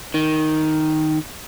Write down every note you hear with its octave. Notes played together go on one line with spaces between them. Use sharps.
D#3